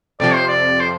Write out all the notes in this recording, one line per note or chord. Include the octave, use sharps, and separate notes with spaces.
F2 C3 F3 D5
C5
D5
C5